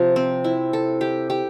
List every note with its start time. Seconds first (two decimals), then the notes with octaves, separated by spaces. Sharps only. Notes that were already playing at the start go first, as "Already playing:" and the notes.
Already playing: C3 F3
0.16 C4
0.44 E4
0.73 A4
1.01 G4
1.30 G4